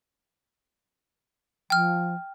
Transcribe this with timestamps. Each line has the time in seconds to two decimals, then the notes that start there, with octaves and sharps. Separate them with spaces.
1.70 F3 G5 F6